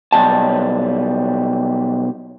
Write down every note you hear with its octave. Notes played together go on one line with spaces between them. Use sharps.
B1 F#3 G3 A5